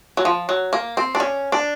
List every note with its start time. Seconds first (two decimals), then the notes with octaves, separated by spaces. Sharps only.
0.17 F#3
0.25 F3
0.49 F#3
0.73 A#3
0.97 C4
1.15 D4
1.20 C#4
1.52 D4